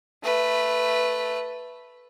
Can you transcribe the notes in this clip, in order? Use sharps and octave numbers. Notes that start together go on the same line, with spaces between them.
A3 B4